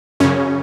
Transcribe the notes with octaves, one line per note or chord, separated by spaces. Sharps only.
F#2 C#3 C#4